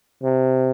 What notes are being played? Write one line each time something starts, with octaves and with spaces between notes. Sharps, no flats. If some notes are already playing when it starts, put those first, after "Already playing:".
C3